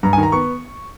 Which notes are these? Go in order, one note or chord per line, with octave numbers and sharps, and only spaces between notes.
G2 A#5
G#5
D#3
A#5
B3 C#6